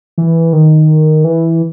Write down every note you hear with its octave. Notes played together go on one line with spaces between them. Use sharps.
E3
D#3
E3